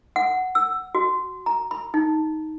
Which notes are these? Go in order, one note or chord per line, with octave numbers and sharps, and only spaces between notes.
F#5
E6
F#4
A#5
B5
D#4